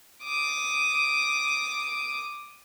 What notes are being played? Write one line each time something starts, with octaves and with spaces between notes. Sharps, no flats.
D6 D#6